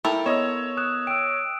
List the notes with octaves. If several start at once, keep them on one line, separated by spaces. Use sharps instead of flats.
A#3 E4 A4 G5 F7
B3 C#5 D#5 E6 E7
D#6 F#6 E7
G5 E6 D7